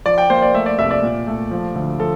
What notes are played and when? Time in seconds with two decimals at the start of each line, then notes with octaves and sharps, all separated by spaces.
0.06 F3 D5
0.18 G5
0.30 A#3 C5
0.42 D5
0.54 A3 E5
0.66 D5
0.78 C2 E5
0.91 D5
1.03 A#2
1.27 A3
1.51 F3
1.75 D2
2.00 F3 A4